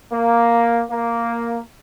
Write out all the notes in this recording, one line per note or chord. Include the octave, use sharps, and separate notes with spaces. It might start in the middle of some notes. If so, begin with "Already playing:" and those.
A#3
A#3